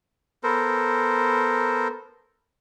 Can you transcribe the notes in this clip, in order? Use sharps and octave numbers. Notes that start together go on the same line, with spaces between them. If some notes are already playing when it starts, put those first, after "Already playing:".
B3 A4 A#4 C5